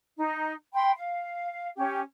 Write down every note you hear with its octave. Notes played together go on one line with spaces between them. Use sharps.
D#4
G5 B5 C6
F5
C#4 G4